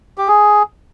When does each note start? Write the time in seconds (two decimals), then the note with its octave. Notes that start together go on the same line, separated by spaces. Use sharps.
0.18 G4
0.28 G#4